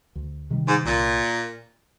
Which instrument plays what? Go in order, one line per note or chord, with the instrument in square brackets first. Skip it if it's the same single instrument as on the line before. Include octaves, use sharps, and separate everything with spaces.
[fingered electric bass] D2
C3 D#3 G3
[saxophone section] G#2
[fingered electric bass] C2 [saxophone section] A#2